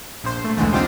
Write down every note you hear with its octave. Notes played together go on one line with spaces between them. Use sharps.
A#1 C5
A3
B1 E2 D3 E3 G#3 A3
C4 D4 D#4 F4 G4 C5